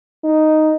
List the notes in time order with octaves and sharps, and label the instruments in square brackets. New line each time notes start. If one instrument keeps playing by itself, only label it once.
[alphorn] D#4